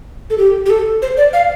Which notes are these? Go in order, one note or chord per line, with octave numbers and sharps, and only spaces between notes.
A4
G4
G4
A4
C5
D5
F5